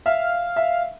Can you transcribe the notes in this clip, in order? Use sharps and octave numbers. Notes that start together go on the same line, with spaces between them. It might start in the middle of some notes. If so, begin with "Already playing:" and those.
E5 F5
E5